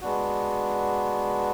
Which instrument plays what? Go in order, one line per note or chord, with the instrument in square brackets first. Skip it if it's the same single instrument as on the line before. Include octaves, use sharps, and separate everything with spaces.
[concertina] G#3 B3 D4 F#4